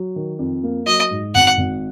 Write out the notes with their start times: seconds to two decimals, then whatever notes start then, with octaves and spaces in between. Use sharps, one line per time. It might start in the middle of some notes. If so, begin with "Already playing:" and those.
Already playing: F#3
0.16 D#3
0.39 F2
0.64 A#3
0.86 F#3 D#5
1.11 G#2
1.34 G#1 F#5
1.58 G#1